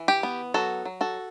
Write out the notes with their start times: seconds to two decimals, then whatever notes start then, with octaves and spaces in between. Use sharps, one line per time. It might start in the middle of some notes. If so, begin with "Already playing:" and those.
Already playing: E3
0.08 G4
0.23 B3
0.54 F#3 F#4 A4
0.85 F#3
1.01 F#4 A4